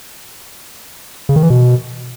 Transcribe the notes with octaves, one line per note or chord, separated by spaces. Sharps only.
C#3
D#3
E3
B2